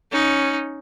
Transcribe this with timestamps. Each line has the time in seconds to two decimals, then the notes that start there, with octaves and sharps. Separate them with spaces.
0.11 C#4 D#4